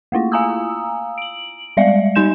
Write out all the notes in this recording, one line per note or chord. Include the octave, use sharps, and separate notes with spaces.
A3 A#3 E4 F4
F5 G#5 A#5 D#6 E6
D7 F#7
G3 G#3 D5 E5 F5
G3 D#4 G#5 C6 G6 E7